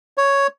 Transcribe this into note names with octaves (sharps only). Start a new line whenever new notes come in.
C#5